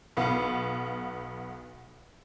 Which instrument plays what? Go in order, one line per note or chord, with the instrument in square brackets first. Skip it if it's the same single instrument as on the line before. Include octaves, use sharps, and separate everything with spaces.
[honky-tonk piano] B1 B3 F5